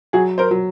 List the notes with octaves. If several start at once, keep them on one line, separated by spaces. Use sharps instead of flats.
F#3 F#4 G#4
A#4 C5
F#3